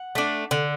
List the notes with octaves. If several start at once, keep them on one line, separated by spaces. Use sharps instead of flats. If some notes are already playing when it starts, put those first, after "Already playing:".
Already playing: F#5
A3 D4
D3